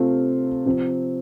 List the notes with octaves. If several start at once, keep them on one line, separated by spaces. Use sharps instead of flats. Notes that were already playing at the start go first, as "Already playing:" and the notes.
Already playing: C3 A3 C4 F4
C3 F3 C4